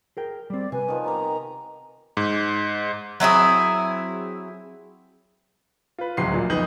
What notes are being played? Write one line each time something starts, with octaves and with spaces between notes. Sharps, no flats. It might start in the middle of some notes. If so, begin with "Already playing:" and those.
G#4 A#4 G5
G3 C4 D5
C3 B4 G#5
D#3 F3
B3 G4 A#4 A#5
G#2
F#3 C4 E4 G#4
F4 B4
D1 C#2 F#3 C6 C7
A#1 A#2
F#1 F2 B3 D#4 G6 F#7